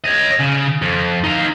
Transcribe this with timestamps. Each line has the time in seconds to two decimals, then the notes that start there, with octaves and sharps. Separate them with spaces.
0.04 C#5 D#5
0.39 C#3
0.82 F2
1.24 D#4 F5